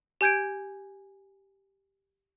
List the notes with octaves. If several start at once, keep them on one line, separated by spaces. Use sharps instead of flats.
G4 G#5 G6 G#6 D7